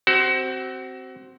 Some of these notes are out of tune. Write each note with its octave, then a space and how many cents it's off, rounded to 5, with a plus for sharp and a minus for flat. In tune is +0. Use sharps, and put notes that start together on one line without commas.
C4 +0 F#4 +30